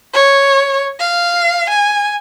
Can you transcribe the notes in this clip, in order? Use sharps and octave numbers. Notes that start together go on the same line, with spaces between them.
C#5
F5
G#5